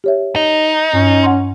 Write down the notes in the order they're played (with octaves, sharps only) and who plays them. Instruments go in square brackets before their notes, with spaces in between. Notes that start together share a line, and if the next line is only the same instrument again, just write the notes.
[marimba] G4 C#5 E5
[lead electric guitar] D#4
[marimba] G2 [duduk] C#4
[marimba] F#5 C6